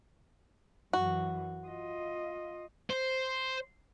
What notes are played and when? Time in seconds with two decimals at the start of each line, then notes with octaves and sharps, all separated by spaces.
0.93 F#2 E3 F#4
1.67 F4 D#5
2.90 C5